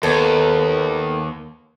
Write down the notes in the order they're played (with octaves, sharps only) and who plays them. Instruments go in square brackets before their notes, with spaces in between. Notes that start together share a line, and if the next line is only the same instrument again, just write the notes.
[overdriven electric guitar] D#2 [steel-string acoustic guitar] B3 A4